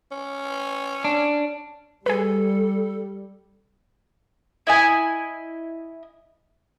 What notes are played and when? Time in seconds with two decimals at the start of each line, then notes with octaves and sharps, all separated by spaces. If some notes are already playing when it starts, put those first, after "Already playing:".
0.12 C#4
1.04 D4
2.06 G3 G#4 A4 B4
4.67 E4 D#5 G#5